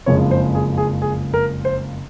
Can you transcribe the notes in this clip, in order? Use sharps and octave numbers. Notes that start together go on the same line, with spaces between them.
F#1 F2 C#3 F3 G#3 C#5
C5
G#4
G#4
G#4
A#4
C5